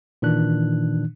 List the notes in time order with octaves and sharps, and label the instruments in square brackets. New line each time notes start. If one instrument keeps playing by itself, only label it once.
[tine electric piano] A#2 D#3 E3 D4 F#6